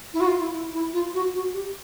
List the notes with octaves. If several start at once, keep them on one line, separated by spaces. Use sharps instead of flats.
E4
F#4
F4
E4
E4
E4
F4
F#4
F#4
G4